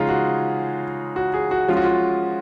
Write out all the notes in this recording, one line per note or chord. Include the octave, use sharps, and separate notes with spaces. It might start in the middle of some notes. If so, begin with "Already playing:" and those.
Already playing: C#3 F3 G#3 C#4 D#4 F4 G#4
F#4
F#4
G#4
F#4
F3 G#3 C#4 F4
F#4
F4